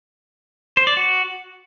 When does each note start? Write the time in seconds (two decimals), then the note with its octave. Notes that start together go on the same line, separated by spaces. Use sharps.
0.77 C5
0.87 D5
0.97 F#4